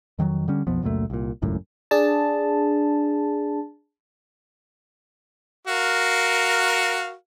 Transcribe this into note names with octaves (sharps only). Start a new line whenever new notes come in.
F2 D#3 F3 F#3
D3 G3 C#4
B1 F2 F3 B3
C#2 F#2 A#2 A3
C2 A#2
G#1 C#2 F#2 A2
D4 G#4 A5
F#4 A#4 F5